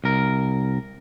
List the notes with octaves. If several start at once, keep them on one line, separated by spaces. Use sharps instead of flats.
C2 A#4